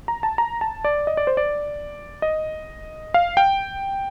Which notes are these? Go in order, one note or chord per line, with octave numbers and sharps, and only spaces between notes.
A#5
A5
A#5
A5
D5
D#5
D5
C5
D5
D#5
F5
G5